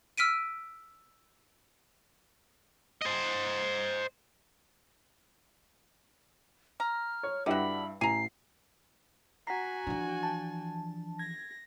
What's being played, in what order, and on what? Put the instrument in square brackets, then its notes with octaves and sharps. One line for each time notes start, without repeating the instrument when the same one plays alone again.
[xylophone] E6 F6 B6 D7 D#7
[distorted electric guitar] C5 D#5
[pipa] A#5 [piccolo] F6
[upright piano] C#5
[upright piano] G2 E4 G5 [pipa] D3 F#4 [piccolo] B5
[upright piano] A1 [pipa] G#5 A#5 [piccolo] C7
[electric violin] F#4 G#5 [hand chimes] F#5 B6 C7 [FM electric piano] A#5
[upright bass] E3 F3 [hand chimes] D4
[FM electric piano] A5
[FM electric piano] G#6 [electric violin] A#6